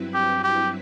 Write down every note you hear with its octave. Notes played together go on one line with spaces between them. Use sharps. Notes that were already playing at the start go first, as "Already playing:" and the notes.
Already playing: G2 F#3 C4 E4 B4
G4
G4